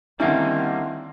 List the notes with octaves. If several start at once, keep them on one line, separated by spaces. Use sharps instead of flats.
D3 D#3 G3 A#3 C4 C#4 E4 E5